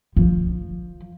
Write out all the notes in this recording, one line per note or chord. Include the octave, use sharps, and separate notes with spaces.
F3